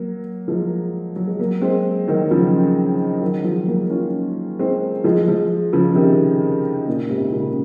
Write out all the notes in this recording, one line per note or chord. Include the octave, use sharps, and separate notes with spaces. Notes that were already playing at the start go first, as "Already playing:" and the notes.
Already playing: F#3 A#3
F3 G#3
F#3
G#3
F#3 A#3
G#3 C4
D#3 F#3
C#3 F3
D#3 F#3
F3 G#3
F#3 A#3
C#4 F4
G#3 C4
F3 G#3
F3 G#3
C#3 F3
C3 D#3
A#2 C#3
G#2 C3
A#2 C#3